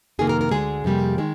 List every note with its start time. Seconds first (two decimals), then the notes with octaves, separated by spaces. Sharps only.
0.19 F2 C3 D#3 A#3 G#4
0.29 A#4
0.41 A#4
0.51 D2 D3 G#3 G#4
0.84 F2 C3 G3 A#3
1.18 D#3 G#3